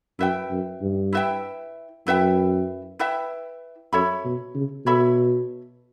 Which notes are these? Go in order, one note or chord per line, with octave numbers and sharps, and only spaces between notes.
F#2 E4 B4 E5 G5
F#2
G2
E4 B4 E5 G5
F#2 E4 B4 E5 G5
E4 B4 E5 G5
F#2 A4 C#5 E5 B5
B2
C#3
B2 A4 C#5 E5 B5